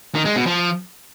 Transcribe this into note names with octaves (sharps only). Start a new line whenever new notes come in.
D#3
G#3
B2
F3